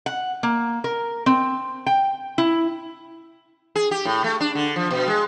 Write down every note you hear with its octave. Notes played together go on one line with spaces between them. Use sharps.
F#5
A#3
A#4
C4
G5
E4
G#4
G4
A2
A3
D4
D3
F3
B2
G#3